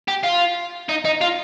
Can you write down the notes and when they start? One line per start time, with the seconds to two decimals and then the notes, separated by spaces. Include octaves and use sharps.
0.08 G4
0.24 F4
0.89 D#4
1.05 D#4
1.21 F4